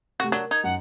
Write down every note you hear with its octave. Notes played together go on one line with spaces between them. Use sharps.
C3 A3 F#4
F#3 D4 A#4
D#4 G#6
F#2 F#5